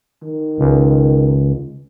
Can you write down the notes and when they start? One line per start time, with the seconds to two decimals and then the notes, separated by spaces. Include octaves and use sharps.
0.22 D#3
0.58 C#2